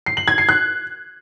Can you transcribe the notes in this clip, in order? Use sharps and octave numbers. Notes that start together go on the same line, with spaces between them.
C7
F#7
G#6
C7
F#6